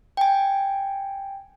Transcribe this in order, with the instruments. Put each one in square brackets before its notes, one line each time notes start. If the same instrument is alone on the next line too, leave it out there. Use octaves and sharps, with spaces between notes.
[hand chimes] G5 G#5